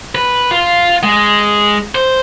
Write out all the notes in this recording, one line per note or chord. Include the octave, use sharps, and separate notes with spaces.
B4
F4
G#3
C5